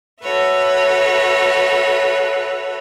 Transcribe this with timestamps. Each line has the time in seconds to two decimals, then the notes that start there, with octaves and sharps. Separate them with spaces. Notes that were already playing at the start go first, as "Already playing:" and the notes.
0.23 F#4 A4 B4 C#5 E5